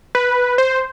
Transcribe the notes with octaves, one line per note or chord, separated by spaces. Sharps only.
B4
C5